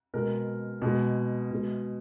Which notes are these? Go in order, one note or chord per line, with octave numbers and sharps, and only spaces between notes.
B2 G#3 A#4
B2 G#3
B2 G#3